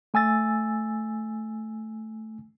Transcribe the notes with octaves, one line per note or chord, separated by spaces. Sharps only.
A3 G#5 E6 A6